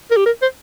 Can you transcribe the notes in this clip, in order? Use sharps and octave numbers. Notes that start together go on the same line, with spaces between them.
A#4
G4
A#4
C5